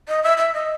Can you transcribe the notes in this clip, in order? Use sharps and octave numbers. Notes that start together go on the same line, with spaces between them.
D#5
E5
E5
D#5